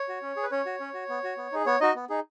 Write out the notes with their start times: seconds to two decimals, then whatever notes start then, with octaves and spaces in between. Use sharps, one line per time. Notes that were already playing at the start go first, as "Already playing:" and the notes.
Already playing: C#5
0.09 F#4
0.22 C#4
0.36 G#4
0.43 B4
0.51 C#4 C#5
0.66 F#4
0.80 C#4
0.94 F#4
1.09 B3
1.24 F#4
1.37 B3
1.52 D#4 G#4
1.66 B3 C#5
1.81 D#4 F#4 D#5
1.95 B3
2.10 D#4 G#4